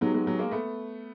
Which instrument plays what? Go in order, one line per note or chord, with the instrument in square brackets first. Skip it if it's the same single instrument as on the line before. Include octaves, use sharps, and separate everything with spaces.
[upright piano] F#3 G#3 [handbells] B3 D#4 G4
[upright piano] F#3 G#3
F#3 G#3
G#3 A#3
A3 B3